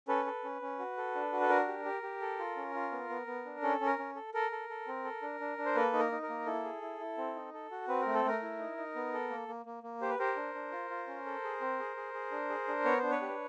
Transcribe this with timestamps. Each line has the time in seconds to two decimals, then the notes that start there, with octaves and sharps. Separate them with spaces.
0.08 C#4 A4 B4
0.26 A4
0.44 C#4
0.62 C#4
0.79 F#4
0.97 A4
1.15 D4
1.33 F#4
1.41 A4
1.49 D4 A#4
1.68 G4
1.85 G4
2.03 G4
2.21 A4
2.39 F4
2.56 C#4
2.75 F4
2.92 B3
3.09 B3
3.27 B3
3.45 D4
3.63 C#4 A4
3.80 C#4
3.86 A#4
3.99 C#4
4.15 A4
4.34 A4 A#4
4.52 A4
4.69 A4
4.88 C4
5.04 A4
5.22 D4
5.40 D4
5.58 D4
5.65 C5
5.75 A#3 A4 B4
5.93 D#4
5.99 A#4
6.12 D#4
6.22 A#4
6.29 A#3
6.46 E4 A4
6.64 G#4
6.82 E4
7.00 E4
7.18 C4
7.35 D#4
7.54 A4
7.71 F#4
7.88 C4 B4
8.02 A3 A#4
8.14 A4
8.25 A3 A#4
8.42 E4
8.59 D#4
8.77 D#4
8.96 B3
9.13 A4
9.30 A#3
9.48 A#3
9.66 A#3
9.83 A#3
10.01 G4 C5
10.10 B4
10.19 G4 A#4 C5
10.36 D4
10.55 D4
10.72 F4
10.90 F4
11.07 C#4
11.26 A4
11.44 G#4
11.61 C4
11.80 G#4
11.96 G#4
12.14 G#4
12.32 D4
12.49 G#4
12.68 D4
12.85 B3 C#5
12.98 D4 C5
13.11 B4 C#5
13.21 G4